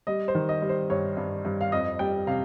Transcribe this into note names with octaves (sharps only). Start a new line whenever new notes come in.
G3 D#5
C5
D#3
D#5
G3
C5
G2 C#5
G2
G2
F5
F2 D#5
G3 G5
C3 F5